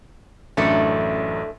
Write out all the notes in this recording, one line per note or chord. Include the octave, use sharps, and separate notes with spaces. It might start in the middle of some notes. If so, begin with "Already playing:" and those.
A1 F#2 A3 D4 A4